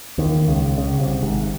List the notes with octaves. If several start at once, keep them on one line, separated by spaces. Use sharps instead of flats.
D#2 D#3
C#2 C#3
C#2 C#3
C2 C3
G#1 G#2